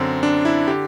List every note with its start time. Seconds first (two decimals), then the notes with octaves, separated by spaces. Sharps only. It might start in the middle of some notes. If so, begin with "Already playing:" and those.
Already playing: F#2 D3 C4
0.23 D4
0.45 E4
0.67 D3 G4